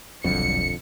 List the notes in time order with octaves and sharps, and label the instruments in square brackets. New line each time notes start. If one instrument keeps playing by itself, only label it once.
[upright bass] D#1 B1 [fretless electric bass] F2 D3 [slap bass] F#3 G3 [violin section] C#7